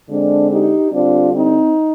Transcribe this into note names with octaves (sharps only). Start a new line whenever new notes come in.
D3 G#3 C4 D4
D#4 G4
D3 G3 C4 D4 F4
C4 D#4